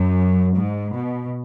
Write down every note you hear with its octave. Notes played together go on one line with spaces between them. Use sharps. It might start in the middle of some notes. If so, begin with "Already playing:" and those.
Already playing: F#2
G#2
B2